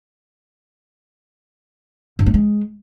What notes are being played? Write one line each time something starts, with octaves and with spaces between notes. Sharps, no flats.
G2
A3
G#3